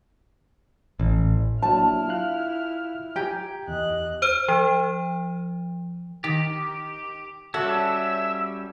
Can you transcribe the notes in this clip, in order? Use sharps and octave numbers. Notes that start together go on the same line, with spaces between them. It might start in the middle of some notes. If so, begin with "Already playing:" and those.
A1
F#3 A#3 D4 E4 A5 F6
F4 F5 F#6
G4 G5 G#5 A#5
E2 D#5 F#6
C5 F6 D#7
F3
D#3 G4
G3 C#4 F#4 A4 E5